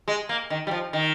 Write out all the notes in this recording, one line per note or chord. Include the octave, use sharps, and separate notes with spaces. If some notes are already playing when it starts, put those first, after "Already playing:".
G#3
A#3
D#3
G3
F3
D#3